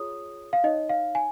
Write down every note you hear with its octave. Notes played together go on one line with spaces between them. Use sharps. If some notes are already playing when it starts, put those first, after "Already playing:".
Already playing: F4 G#4 C#5 D#6
F5
D#4 C#5 D#5
F5
G#5